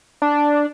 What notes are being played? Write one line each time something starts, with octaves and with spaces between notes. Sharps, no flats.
D4